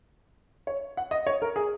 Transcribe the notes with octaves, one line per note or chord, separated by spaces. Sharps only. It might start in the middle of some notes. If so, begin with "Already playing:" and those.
C#5
F#5
D#5
C#5
A#4
G#4